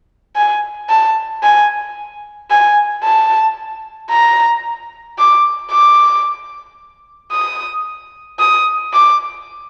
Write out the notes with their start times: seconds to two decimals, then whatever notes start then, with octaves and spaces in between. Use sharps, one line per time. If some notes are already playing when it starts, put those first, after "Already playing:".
0.36 G#5
0.89 A5
1.43 G#5
2.51 G#5
3.03 A5
4.11 A#5
5.19 D6
5.71 D6
7.32 D#6
8.39 D#6
8.93 D6